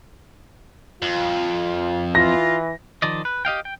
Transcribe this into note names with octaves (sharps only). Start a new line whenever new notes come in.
F2 F4
E3 F4 A#6
D#3 F3 D5 D#5
B4
G4 D#5 F5 G5
G5